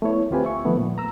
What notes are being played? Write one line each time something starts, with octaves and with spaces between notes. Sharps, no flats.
A3 B3 E4 C#5
D#2 C4 F4 G4 B4 G#5
E5 C#6
D#3 F3 A3 B3
A#2
A#5 E6